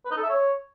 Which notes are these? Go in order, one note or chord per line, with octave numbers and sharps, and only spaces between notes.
B4
D#4
A4
E5
C#5